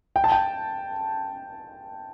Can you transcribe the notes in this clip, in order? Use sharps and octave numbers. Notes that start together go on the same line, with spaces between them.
G5
A5
G5